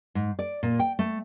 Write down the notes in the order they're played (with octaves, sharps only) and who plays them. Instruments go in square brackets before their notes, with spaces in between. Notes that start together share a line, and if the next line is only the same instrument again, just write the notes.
[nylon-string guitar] G#2
D5
A#2
G5
A3